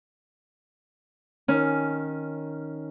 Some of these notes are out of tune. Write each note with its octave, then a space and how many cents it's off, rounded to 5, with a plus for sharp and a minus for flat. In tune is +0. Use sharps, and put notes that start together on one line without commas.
D#3 +0 C#4 +0